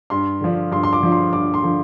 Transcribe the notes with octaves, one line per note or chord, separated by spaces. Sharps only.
G2 C6
D3 F3 D4
G2 C6
C6
D6
D3 F3 D4
C6
G2 D6
C6
D3 F3 D4